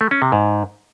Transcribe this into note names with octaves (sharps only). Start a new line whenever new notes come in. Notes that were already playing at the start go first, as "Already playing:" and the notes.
A3
C#4
C3
G#2